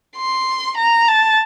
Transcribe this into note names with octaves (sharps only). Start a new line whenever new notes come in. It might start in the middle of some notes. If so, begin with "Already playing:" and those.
C6
A#5
A5